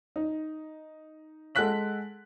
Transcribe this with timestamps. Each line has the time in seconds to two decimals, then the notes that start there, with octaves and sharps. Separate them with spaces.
0.16 D#4
1.55 G#3 A4 F#5 F#6 B6 F#7